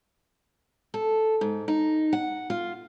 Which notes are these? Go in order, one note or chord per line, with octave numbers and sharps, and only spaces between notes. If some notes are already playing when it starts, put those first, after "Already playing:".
A4
G#2
D#4
F#5
F4